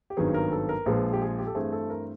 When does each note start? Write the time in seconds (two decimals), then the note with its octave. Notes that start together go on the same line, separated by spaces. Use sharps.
0.10 G4
0.17 G#1 G2 D#3 F#3 B3 G#4
0.34 A#4
0.52 A4
0.69 A#4
0.86 A#1 A#2 F3 G#3 B4
1.13 G4
1.21 G#4
1.39 G4
1.47 A4
1.55 G2 E3 A3 C4 G#4
1.72 A4
1.90 A#4